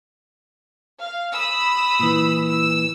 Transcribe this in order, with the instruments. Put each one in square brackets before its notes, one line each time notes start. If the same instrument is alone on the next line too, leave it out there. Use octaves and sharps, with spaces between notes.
[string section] F5
B5 D#6 E6
[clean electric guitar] A#2 E3
[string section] E6